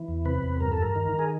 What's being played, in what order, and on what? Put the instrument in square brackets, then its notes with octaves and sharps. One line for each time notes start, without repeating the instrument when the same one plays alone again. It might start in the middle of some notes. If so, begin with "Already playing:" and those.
Already playing: [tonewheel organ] E3
E2
C3 B4
E2
G2 A#4
A4
G2 A#4
D#3
D#3
G#4